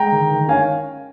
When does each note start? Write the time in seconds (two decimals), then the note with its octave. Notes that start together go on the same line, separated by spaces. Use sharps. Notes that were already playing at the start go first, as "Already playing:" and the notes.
Already playing: G#3 G5 A#5
0.12 D#3
0.31 D#3
0.48 C#4 F5 G#5